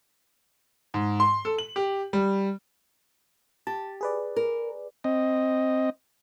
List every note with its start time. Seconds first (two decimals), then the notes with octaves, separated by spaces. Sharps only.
0.94 G#2
1.20 C6
1.45 A4
1.58 F#7
1.76 G4
2.13 G3
3.67 G4 A5
4.01 G#4 B4 D5
4.36 A#4
5.04 C4 D#5